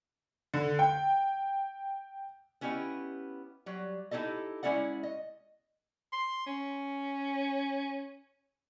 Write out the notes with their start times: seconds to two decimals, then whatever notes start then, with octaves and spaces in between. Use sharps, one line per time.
0.54 D3
0.79 G5
2.61 B3 C#4 E4 G4 D#5
3.66 F#3 G3
4.11 D#4 E4 G4 A4 D#5
4.63 G#3 C#4 E4 D5 F#5
5.03 D#5
6.13 C6
6.46 C#4